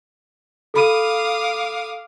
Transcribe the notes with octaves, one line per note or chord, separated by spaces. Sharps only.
A4 F5 B5 D6 D#6 D#7